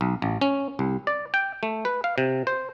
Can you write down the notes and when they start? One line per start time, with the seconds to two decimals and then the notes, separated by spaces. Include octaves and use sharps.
0.01 B1
0.22 A1
0.41 C#4
0.79 C2
1.07 D5
1.34 G5
1.63 A3
1.85 B4
2.04 F5
2.18 C3
2.47 C5